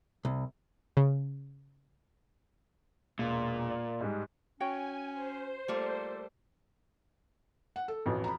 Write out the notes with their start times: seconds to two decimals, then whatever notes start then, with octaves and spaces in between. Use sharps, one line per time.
0.25 C2
0.97 C#3
3.19 E1 A#2
3.70 D5
4.00 G#2 G3 G#3
4.60 C#4 F#4 C#5 G5 G#5
5.12 C5
5.68 G3 A3 A#3 F4 A4
7.76 F#5
7.88 A4
8.06 A1 F2 B2 E3
8.24 A#5 B5